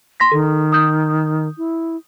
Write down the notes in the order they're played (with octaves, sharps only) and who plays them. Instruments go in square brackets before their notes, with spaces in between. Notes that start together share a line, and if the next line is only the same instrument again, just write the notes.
[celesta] C6 A#6 B6
[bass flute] D#3 [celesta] A4
[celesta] D#6 G6
[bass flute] E4